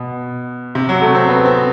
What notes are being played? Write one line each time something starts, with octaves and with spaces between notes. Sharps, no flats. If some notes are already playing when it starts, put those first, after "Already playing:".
Already playing: B2
C3
F#3
A3
C4
B3
C4